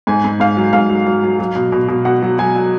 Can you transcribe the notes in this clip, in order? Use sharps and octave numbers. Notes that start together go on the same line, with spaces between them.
G#2 G#5
G#2
G#2 F5
F#3
G#2 F5
F#3
F#3
F#3
F#3
B2
B2
B2
B2 F#5
F#3
F#3 G#5
F#3